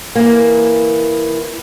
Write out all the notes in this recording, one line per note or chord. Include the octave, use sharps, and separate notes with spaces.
E3 A#3